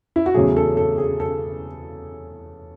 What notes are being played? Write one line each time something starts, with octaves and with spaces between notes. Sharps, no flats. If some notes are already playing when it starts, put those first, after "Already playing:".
E4
F#4
E2 C#3 F#3 A3 G#4
A4
A4
G#4
A4